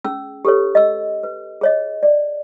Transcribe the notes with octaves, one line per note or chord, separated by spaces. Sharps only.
C#4 G#4 E6
G4 A4 B4 C#5
D#5 E6
B4
G#4 C#5 D#5
D5